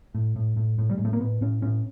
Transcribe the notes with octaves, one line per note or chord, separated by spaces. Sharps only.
A2
A2
A2
A2
G3
A2 G#3
A3
A#3
A2 B3
A2 C#4
A2 C#4